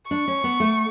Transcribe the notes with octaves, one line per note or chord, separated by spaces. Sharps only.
D4 C#6
C#4
B3
A3